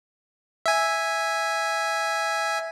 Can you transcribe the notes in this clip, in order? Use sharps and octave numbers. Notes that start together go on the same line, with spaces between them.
E5 G#5